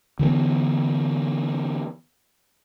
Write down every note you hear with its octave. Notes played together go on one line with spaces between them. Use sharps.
D3 E3 G3 B3